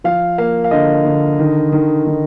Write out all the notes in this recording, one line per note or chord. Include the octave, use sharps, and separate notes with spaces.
F3 F5
A#3 F5
F5
D3 D#5
D3
D#3
D#3
D#3